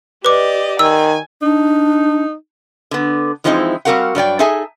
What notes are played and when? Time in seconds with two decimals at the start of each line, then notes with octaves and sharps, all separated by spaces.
0.25 G4 B4 D5 D#5 D6
0.79 D#3 G#5 E6
1.42 D4 D#4
2.91 D3 B3
3.44 E3 F3 G#3 C4 D#4 E4
3.85 G3 C4 F#4 A#4 F5 F#5
4.15 G2 F#3 D5 G5
4.39 D#4 G#4 A4 E5 G#5 A5